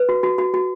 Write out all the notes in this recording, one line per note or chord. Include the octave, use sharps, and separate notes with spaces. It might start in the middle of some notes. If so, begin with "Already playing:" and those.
Already playing: B4
F#4
F#4
F#4
F#4